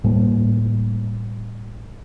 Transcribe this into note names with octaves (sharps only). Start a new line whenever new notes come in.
A2 G3 A#3